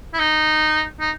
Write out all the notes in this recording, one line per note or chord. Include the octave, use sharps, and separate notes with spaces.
E4
D#4
D#4